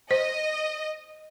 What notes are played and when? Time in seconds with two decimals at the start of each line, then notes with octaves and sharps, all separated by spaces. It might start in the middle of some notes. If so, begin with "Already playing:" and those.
0.11 C5 D#5